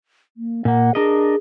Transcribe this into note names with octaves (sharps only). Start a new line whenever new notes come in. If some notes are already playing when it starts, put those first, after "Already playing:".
A#3
A#2 A#3 F#5
D4 G#4 A#4 D#5